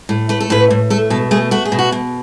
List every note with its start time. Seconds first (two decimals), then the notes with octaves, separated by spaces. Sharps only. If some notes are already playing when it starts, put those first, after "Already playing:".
0.09 A2
0.29 A3 B4
0.40 A4
0.50 A2 B4
0.70 A2
0.90 A3 A4
1.10 B2 A4
1.31 A3 G#4
1.51 A3 F#4
1.65 G#4
1.72 B2
1.79 F#4
1.92 B2